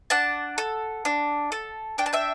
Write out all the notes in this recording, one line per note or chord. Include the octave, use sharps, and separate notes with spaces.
D4 F#5 A5
A4
D4
A4
D4 G5
A5
E5 G5